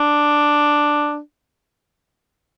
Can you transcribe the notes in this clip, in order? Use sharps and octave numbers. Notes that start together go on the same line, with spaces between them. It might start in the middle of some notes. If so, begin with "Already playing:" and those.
Already playing: D4